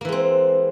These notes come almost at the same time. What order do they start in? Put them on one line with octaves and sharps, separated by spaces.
A#3 E3 G#3 C4